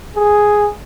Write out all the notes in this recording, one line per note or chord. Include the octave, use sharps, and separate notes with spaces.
G#4